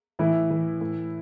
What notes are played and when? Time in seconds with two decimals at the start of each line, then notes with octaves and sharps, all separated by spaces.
0.19 A2 E3 E4
0.51 E3
0.81 A2